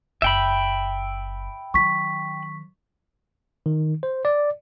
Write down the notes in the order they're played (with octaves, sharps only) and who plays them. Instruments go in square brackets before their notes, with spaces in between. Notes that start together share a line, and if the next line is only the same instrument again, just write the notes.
[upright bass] F#1 [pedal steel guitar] E5 G5 B5
[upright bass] D#3 F#3 [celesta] C#6 B6
[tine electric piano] D#3
C5
D5